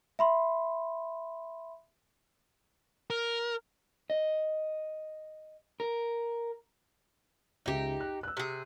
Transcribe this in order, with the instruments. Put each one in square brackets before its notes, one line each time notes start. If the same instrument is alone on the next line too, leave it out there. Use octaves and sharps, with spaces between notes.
[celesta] E5 B5 C6
[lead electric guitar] A#4
[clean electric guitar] D#5
A#4
[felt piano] C#2 E5 [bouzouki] D#4 G4
[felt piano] F#6
E6 F#6
[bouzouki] C3 G#4